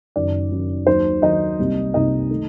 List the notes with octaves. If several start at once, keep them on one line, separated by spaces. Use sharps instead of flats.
F#1 F#2 D#3 F#3 D5
F#1 F#2 D#3 F#3
D#2 D#3 F#3 C5
D#2 D#3 F#3 D#4 D#5
C2 C3 G3 A#3
C2 C3 G3 A#3 D#4 D#5
D#3 A3